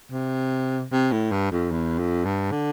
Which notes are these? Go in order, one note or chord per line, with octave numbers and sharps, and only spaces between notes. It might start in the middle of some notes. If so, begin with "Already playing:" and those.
C3
C3
A2
G2
F2
E2
F2
G2
D3